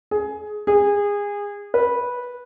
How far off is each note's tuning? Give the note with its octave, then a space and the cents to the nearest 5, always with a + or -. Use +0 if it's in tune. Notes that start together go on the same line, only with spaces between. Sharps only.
G#4 +15
G#4 -25
B4 -10